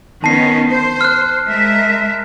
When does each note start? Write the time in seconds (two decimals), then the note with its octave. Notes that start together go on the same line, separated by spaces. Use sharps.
0.24 D#3 B3 C#4 A5 C7
0.69 C5
1.01 F6 F#6
1.46 G#3 A#4 E5